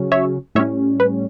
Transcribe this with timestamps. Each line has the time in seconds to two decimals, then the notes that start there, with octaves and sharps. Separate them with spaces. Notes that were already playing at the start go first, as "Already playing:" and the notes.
Already playing: C#3 F#3 C#4
0.12 C#5 E5
0.55 A2 G3 C#4 C#5 E5
1.00 B4